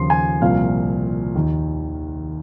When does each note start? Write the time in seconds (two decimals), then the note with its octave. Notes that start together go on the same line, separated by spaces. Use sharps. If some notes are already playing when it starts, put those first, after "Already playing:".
Already playing: D#2 C#3 F3 C6
0.10 G#5
0.42 C2 A#2 F3 F5
1.35 D#2 D#3